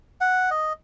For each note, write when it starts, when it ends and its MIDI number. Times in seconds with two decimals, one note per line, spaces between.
0.21 0.50 78
0.51 0.73 75